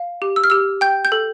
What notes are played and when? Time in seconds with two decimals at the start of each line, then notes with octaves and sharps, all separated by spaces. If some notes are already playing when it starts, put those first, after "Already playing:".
Already playing: F5
0.22 G4
0.36 E6
0.44 F6
0.50 G4 E6
0.81 G5 G6
1.05 G6
1.12 A4